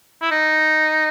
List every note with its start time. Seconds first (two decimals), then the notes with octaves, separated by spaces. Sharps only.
0.22 E4
0.31 D#4